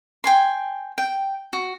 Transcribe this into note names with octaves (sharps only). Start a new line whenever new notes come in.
G5 G#5 C6
G5
F#4